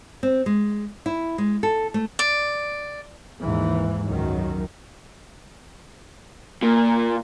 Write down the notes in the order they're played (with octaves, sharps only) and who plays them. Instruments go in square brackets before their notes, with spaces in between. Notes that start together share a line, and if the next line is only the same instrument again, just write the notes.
[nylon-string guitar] C4
G#3
E4
G#3
A4
A3
[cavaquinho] D5
[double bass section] D#2 G#2 E3
C#2 F#2 D#3 F#3
[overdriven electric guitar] A#2 [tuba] A#3